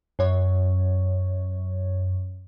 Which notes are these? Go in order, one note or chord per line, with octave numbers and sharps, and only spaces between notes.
F#2 C#5